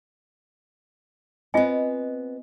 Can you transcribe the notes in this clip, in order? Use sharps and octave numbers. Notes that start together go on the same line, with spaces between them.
B3 C4 F4 D#5 G#5